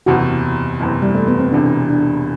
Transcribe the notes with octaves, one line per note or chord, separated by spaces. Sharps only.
F#1 E2 C3 F#4
F#1 E2 C3
G3
A3
B3
C4
E1 E2 C3 D4
D4